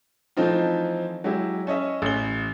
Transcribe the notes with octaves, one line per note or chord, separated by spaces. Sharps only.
E3 F3 A3 C4 D#4 F4
F#3 G#3 E4 G4
C#4 C#5 D#5 E5
A1 G7